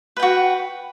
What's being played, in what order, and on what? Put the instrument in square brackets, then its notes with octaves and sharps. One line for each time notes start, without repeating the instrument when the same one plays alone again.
[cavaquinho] B4
G5
F#4